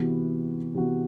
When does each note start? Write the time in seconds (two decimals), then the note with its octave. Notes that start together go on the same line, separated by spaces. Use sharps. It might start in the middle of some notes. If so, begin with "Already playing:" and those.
Already playing: C3 E3 B3 F#4
0.74 C3 E3 B3 F#4